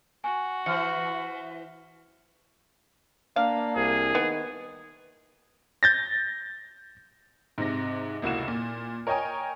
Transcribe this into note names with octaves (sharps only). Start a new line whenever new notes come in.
F#4 G#5
E3 C5 F6 C#7
A#3 D4 F5
C2 G#4
D#3 B3
G6 A6 A#6
G#2 C3 A#6
F1 C#2 A#3 E4 F#4 E7
A#2
A#4 C#5 D#5 G5 G#5 A#5